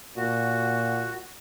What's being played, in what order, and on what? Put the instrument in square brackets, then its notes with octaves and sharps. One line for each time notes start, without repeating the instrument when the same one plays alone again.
[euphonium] A#2 [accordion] F#4